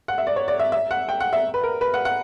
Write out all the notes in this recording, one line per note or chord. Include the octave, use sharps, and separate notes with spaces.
F#5
E5
D5
C#5
D5
E5
E5
F#5
G5
F#5
E5
B4
A#4
B4
F#5
F#5